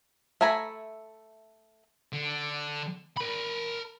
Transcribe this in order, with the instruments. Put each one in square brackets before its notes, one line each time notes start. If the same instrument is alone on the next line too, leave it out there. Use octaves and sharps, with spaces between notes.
[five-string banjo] A3 E5 G#5 A#5 B5
[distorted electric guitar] D3
A#4 B5